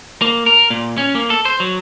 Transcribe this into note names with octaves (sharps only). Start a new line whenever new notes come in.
A#3
A#4
A#2
C#4
A#3
A4
C5
F#3